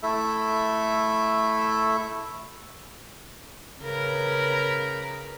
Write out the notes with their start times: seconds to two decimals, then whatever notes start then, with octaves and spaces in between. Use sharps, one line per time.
0.03 A3 E4 A4 E5
3.82 C#3 A#4 B4